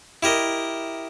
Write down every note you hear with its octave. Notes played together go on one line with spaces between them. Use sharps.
E4 G4 A#4 D#5